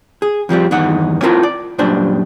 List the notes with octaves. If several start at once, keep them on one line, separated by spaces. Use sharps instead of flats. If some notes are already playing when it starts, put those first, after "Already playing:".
G#4
F2 F3 G3 C4
E2 G2 D#3 D#4 F#5
C4 E4 F4 A#4 A5
D5
F#2 A#2 G3 D4 C5